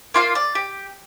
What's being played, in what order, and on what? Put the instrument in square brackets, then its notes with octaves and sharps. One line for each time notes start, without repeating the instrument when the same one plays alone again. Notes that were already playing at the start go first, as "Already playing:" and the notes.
[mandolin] A#3 F4 F5
D5
G4